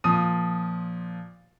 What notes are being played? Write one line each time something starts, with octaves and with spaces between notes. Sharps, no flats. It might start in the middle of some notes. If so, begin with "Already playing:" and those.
A#2 F3 D#6 D#7